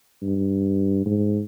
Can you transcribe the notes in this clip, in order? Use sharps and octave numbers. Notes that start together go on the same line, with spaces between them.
G2
G#2